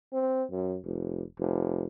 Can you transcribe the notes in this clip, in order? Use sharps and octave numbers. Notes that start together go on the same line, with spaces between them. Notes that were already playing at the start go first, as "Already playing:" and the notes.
C4
F#2
F1
F1